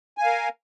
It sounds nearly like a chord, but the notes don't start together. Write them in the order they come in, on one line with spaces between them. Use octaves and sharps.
G#5 F5 A#4